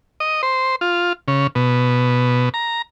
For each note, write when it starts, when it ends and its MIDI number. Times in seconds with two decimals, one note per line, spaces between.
0.20 0.42 75
0.43 0.76 72
0.81 1.13 65
1.28 1.47 49
1.55 2.49 47
2.54 2.82 82